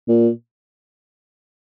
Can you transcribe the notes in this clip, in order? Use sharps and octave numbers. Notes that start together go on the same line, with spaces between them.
A#2